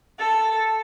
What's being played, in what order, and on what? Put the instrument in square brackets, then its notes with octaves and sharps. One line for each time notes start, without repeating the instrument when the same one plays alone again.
[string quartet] A4